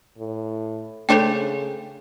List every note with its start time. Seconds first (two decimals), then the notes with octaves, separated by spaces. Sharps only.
0.18 A2
1.09 C#3 A3 D4 A4 C5 C#5 G5